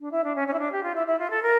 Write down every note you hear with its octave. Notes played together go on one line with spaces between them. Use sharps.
D4
E4
D4
C#4
C#4
E4
D4
G4
F4
E4
E4
F4
A4
A#4